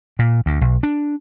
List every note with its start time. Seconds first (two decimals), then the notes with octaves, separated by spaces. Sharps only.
0.19 A#2
0.46 D2
0.61 B1
0.83 D4